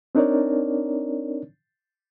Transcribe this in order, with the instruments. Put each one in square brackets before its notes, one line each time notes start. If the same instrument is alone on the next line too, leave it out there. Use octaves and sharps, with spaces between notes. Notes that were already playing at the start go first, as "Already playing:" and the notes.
[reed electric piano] C4 D4 D#4 A#4 C#5 D5